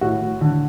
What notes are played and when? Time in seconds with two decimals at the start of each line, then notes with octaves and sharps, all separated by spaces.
0.01 A2 F#4
0.21 A2
0.41 D3